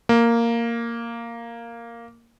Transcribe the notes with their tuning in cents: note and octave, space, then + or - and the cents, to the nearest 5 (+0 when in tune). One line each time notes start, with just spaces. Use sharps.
A#3 -5